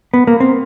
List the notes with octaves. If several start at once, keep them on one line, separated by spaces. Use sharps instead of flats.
B3
A#3
C4